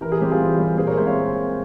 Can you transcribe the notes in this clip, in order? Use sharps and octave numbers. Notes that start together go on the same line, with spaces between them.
E3 A#4
G#4
G3 C4 G4
F4 G#4
E3
G3 C4
A#2 G#4 C5
A#4 C#5
G#3 C4 C5 E5
C#5 F5